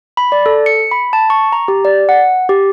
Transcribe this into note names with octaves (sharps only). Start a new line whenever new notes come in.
B5
D5
A4
C#7
B5
A5
C#6
A#5
G4
D5
F#5
G4